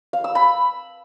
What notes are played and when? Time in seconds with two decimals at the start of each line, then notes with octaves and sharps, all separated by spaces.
0.13 F5
0.24 E6
0.35 B5